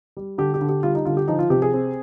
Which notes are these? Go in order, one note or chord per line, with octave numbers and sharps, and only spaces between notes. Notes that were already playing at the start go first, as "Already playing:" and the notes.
G3
D3 G4
G4
D3
G4
G3 F4
D#4
D3 F4
G4
F3 D#4
F4
C3 G4
G#4
C4